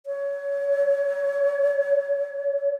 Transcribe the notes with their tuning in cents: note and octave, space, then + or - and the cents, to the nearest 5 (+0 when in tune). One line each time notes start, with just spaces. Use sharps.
C#5 +25